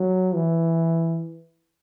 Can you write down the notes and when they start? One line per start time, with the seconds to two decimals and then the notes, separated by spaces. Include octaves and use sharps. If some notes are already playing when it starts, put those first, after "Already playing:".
Already playing: F#3
0.35 E3